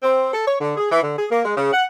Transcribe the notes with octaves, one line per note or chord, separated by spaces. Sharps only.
C4
A4
C#5
D3
G#4
E3
D3
G#4
A#3
G#3
C#3
F#5